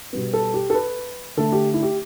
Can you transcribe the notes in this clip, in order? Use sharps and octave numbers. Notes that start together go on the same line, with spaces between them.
B2 G3 B3
A4
G4
A4
B4
D3 A3 A4
G4
E4
G4